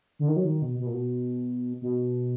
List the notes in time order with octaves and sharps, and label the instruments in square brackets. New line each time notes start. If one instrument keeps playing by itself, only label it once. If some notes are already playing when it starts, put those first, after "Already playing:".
[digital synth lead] D3
D#3
F#3
D#3
B2
B2
A#2
B2
B2